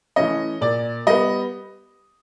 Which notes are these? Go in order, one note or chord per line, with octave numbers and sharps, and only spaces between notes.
E3 A3 C#4 D#5
A#2 D5
G3 B3 D#5